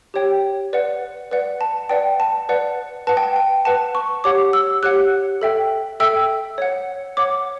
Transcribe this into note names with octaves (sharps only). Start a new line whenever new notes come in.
G4 C#5 G5
B4 D5 F#5
B4 D5 F#5
A5
B4 D5 F#5 G5
A5
B4 D5 F#5
B4 F#5 A5
G5
G5
B4 F#5 A5
C#6
G4 C#5 F#5 D6
E6
G4 C#5 F#5 F#6
A4 E5 G5
A4 E5 G5 E6
C#5 F#5
C#5 F#5 D6